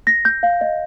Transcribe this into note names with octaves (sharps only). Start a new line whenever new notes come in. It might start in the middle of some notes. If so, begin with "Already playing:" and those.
A#6
G6
F5
D#5